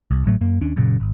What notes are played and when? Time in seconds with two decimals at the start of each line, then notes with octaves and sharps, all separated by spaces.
0.11 C2
0.24 G#1 A2 F#3 A3
0.41 F#2 A#3
0.61 D#2 C#4 D4
0.76 F#1 F#2 A#2 C#3
1.00 G#1